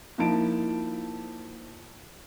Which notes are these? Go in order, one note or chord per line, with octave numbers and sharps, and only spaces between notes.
F3 A#3 D#4 E4 A5 D7